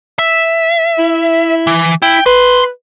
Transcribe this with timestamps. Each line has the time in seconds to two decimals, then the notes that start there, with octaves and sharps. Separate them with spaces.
0.19 E5
0.98 E4
1.67 E3
2.02 E4 G5
2.26 B4 C6